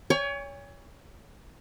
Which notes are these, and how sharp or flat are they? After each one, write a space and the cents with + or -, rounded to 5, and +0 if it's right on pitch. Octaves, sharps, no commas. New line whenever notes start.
C#5 +30 G#5 -40 C#6 +0